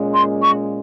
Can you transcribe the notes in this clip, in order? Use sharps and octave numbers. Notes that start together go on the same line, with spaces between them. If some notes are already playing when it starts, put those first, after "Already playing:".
Already playing: A#2 G#3 C#4
C6
C#6